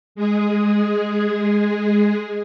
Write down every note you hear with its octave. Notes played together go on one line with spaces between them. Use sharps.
G#3 G#4